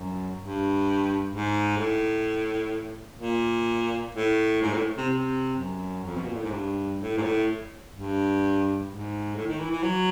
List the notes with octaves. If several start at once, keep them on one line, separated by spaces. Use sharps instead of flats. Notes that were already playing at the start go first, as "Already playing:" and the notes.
Already playing: F#2
G2
G#2
A2
A#2
A2
G#2
A2
C3
C3
F#2
F2
B2
A#2
A2
G#2
G2
A2
G#2
A2
G2
G#2
A2
D#3
E3
E3
F#3